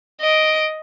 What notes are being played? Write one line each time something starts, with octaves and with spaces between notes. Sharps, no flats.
D#5 D7